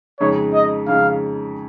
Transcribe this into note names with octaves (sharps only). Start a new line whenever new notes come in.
F2 C#3 G#3 D#4 C#5
D#5
F2 C#3 G#3 D#4 F5